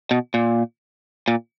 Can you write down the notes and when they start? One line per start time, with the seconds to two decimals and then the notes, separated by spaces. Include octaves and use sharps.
0.11 B2
0.34 A#2
1.28 A#2